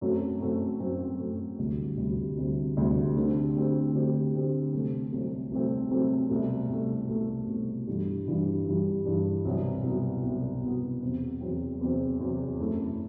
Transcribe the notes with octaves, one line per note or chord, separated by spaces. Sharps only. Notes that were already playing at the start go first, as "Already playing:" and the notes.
F#2 F#3 A3 C4 F#4
F#2 F#3 A3 C4 F#4
F#2 F#3 A3 C4 F#4
F#2 F#3 A3 C4 F#4
D2 C3 G3
D2 C3 G3
D2 C3 G3
D2 C3 G3
D3 A3 C4 G4
D3 A3 C4 G4
D3 A3 C4 G4
D3 A3 C4 G4
C2 C3 F#3 A3 C4
C2 C3 F#3 A3 C4
C2 C3 F#3 A3 C4
C2 C3 F#3 A3 C4
C2 B2 A3
C2 B2 A3
C2 B2 A3
C2 B2 A3
G2 E3 G3 D4
G2 E3 G3 D4
G2 E3 G3 D4
G2 E3 G3 D4
C2 B2 F#3 B3 F#4
C2 B2 F#3 B3 F#4
C2 B2 F#3 B3 F#4
C2 B2 F#3 B3 F#4
E2 C3 F#3 C4
E2 C3 F#3 C4
E2 C3 F#3 C4
E2 C3 F#3 C4
F#2 F#3 A3 C4 E4